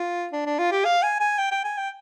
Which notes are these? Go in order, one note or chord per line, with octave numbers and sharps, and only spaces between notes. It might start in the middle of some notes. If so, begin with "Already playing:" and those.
Already playing: F4
D4
D4
F4
G4
F5
G#5
G#5
G5
G5
G#5
G5